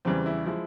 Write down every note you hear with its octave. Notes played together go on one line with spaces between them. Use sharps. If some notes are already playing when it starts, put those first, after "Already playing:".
E2 C#3 E3 G3 C4
E4
F3 G#3 E4